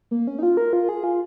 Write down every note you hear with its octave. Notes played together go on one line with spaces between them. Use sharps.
A#3
C#4
D#4
F4
A#4
F4
G#4
F4